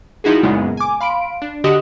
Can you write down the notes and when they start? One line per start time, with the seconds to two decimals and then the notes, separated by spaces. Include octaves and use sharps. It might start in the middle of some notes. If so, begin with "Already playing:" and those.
0.24 F3 D#4 E4 F#4 G#4
0.43 F#2 A#2 C#3 G#3 B3
0.77 G#5 D6
1.01 F5 B5 C6 D7
1.42 D4
1.64 D3 F#4 G4 D#5 D#6